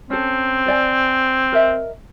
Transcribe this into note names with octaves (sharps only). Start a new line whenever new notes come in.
C4 C#4 A4
C5 D5 G#5
A#4 D#5 E5